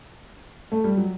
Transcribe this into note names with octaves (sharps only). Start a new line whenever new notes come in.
A3
G3
F#3